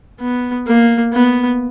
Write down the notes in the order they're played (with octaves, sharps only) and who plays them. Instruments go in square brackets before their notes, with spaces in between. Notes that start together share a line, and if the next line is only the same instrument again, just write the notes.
[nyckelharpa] B3
A#3
B3